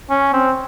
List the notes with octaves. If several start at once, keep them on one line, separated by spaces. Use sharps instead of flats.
C#4
C4